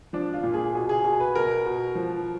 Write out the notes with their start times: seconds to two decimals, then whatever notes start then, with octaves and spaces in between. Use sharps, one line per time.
0.13 F3 D4
0.33 F4
0.43 A#2
0.54 G#4
0.74 B2 G#4
0.89 G#4
1.04 B2 G#4
1.20 B4
1.35 B2 A#4
1.66 B2
1.95 F3